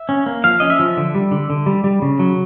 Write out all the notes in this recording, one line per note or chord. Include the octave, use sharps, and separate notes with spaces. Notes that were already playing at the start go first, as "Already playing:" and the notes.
Already playing: E5
C#4
A#3
F3 F5
C#4 D#5
E5
F3
D3
G3
D3
D3
G3
G3
C#3
F#3